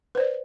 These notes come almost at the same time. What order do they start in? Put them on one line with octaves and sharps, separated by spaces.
B4 C5 D5